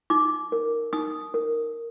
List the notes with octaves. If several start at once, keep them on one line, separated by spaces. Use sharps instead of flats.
D#4 D6
A#4
D#4 D#6
A#4